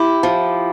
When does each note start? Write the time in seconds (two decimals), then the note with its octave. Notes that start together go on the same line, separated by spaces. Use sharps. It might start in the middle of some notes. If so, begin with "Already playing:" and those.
Already playing: E4 G4
0.23 F3